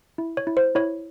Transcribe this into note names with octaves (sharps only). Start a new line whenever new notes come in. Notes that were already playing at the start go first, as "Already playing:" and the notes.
E4
C#5
E4
C5
E4 C#5